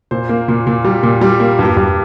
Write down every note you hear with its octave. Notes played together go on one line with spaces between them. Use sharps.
A#2 C5
A#3
A#2
A#2
G3
A#2
G3
A#3
G2
G2